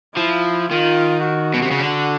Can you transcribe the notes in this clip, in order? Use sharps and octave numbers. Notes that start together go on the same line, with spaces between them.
F3 E4
D#3 F4
F#4
B2
C3
C#3
D3